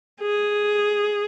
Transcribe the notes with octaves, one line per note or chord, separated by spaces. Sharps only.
G#4